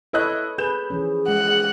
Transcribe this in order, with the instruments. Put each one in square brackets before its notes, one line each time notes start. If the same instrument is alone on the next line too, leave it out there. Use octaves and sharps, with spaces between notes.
[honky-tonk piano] E4 D#5 F#6 [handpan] A4 B4 C#5
[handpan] G#4 B4 [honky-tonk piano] G6 E7
[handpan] E3 F3 C#4 [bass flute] G#4
[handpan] G#3 [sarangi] F#5